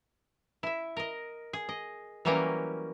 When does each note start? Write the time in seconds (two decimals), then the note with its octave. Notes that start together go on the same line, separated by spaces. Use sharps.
0.63 E4 E5
0.97 A#4 D#5
1.53 G#4
1.69 D#5
2.25 E3 F#3 G3 A#3 C#4 A#4